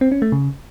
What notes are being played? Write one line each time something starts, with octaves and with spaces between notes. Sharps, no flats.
C4
C#4
A3
C#3